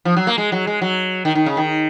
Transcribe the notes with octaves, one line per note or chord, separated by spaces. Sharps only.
F3
F#3
A#3
G#3
F#3
G#3
F#3
D#3
D#3
C#3
D#3